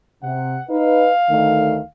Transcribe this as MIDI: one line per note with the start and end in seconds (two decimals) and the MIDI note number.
0.23 0.57 48
0.23 0.62 78
0.70 1.12 63
0.70 1.12 71
0.70 1.86 77
1.29 1.79 38
1.29 1.79 51
1.29 1.79 57